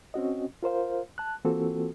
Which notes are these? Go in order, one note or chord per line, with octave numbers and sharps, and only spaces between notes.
C4 C#4 F#4 D#5
F4 A#4 C5 F5
A5 F#6
E3 A#3 C4 F4 F#4 A4